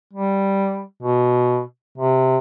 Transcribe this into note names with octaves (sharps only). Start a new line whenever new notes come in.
G3
B2
C3